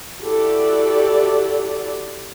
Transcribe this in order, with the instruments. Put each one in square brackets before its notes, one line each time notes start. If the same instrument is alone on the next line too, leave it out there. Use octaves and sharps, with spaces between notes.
[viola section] E4 F#4 G4 A4 D5